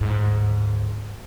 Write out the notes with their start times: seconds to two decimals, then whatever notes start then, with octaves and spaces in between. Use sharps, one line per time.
0.01 D2 G#2